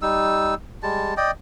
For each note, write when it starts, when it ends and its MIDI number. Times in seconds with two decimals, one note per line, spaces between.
0.02 0.54 55
0.02 0.54 63
0.02 0.54 88
0.83 1.14 55
0.83 1.14 56
0.83 1.14 81
1.17 1.31 74
1.17 1.31 75
1.17 1.31 79